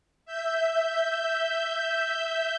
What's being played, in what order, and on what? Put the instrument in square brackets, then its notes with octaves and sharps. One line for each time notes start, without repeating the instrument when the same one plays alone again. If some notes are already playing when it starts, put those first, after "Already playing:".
[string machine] E5 G6